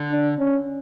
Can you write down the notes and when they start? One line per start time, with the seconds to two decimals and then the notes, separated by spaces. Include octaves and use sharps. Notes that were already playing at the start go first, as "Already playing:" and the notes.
Already playing: D3
0.11 D4
0.39 C#4